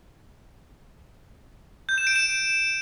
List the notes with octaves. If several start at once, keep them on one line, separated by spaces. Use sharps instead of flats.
G6
E7
D7
E7